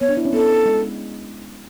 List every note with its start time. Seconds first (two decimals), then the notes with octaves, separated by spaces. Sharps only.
0.01 B3 C#5
0.09 D4
0.17 E4
0.25 C#4
0.33 B3 A4
0.66 G#3